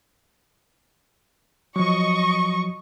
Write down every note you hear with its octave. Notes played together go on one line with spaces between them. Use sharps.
F3 F#3 D#5 C#6